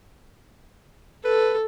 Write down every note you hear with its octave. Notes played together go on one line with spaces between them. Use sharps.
A4 B4